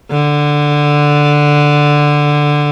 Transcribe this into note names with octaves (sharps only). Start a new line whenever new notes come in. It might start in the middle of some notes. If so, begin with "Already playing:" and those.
D3